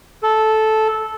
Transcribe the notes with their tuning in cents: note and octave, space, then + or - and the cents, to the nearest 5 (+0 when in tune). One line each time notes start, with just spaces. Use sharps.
A4 -10